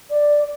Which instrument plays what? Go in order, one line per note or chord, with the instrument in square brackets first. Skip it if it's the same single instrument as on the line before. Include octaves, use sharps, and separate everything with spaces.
[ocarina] D5